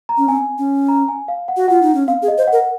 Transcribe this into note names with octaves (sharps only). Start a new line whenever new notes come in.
A#5
C#4
C4 G#5
C#4
A#5
G#5
F5
F#5
F#4
F4 F#5
D#4
C#4
C4 F5
G#4
D#5
C5
A#4 F#5